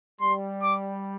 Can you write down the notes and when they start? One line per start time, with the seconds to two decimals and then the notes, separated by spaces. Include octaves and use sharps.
0.21 G3 C6
0.62 D6